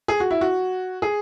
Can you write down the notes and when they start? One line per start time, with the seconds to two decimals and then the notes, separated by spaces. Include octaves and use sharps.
0.08 G#4
0.20 F#4
0.31 E4
0.41 F#4
1.02 G#4